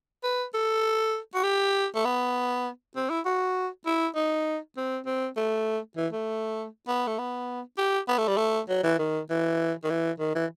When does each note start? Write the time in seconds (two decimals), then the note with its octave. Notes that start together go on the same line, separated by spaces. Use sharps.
0.23 B4
0.54 A4
1.35 F#4
1.43 G4
1.95 A3
2.05 B3
2.96 C4
3.10 E4
3.25 F#4
3.86 E4
4.15 D#4
4.77 C4
5.06 C4
5.36 A3
5.97 E3
6.13 A3
6.88 B3
7.07 A3
7.19 B3
7.78 G4
8.08 B3
8.18 A3
8.28 G3
8.37 A3
8.69 F#3
8.84 E3
8.99 D#3
9.30 E3
9.84 D#3
9.90 E3
10.20 D#3
10.35 E3